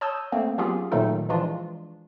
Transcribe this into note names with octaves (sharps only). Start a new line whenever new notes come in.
C#5 A5 D#6 E6 G6
A3 A#3 C4
F#3 B3 C#4 F4 G4 G#4
A#2 D#3 F#3 A3 D#4 A4
E3 F3 G#3 D4 F4